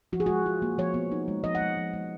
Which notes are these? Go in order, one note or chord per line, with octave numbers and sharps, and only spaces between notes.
F3 F#4
G#4
G#3 F#4
F4
A#3
F3 C#5
B3
D#4
G#3
F3 D#5
F#5
G#3
F3
G#3